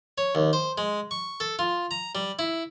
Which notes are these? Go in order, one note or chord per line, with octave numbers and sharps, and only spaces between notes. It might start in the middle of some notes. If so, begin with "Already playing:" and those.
C#5
D#2
C5
G#3
C#6
A4
F4
A#5
G3
E4